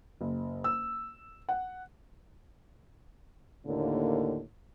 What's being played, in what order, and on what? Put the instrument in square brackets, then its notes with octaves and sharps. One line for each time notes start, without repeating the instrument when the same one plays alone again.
[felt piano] F#1
E6
F#5
[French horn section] D#2 A2 D3 A#3